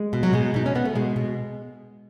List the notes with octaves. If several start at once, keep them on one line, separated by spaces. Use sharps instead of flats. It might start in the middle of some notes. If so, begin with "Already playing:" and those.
Already playing: G#3
B2
F#3
B2 G#3
B2 D#4
C#4
B2 B3
A3
B2 G#3
B2